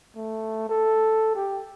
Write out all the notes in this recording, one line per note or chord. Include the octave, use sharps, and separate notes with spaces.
A3
A4
G4